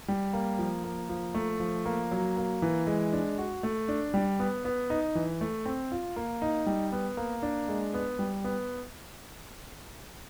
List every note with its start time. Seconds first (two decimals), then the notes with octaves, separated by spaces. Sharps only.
0.08 G3
0.33 A#3
0.59 F3
0.84 A#3
1.09 F3
1.34 A3
1.60 F3
1.86 A#3
2.11 F#3
2.37 A#3
2.62 E3
2.87 G#3
3.13 D4
3.38 F#4
3.63 A3
3.88 D4
4.14 G3
4.39 B3
4.65 B3
4.90 D#4
5.15 E3
5.41 A3
5.66 C4
5.92 F4
6.16 A#3
6.42 D#4
6.66 G3
6.92 B3
7.17 A#3
7.42 D4
7.68 G#3
7.94 B3
8.19 G3
8.44 B3